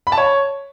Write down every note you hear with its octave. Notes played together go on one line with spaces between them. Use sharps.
B5
A5
C#5